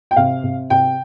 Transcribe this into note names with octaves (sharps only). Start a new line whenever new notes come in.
G5
C3 F5
C3
C3 G5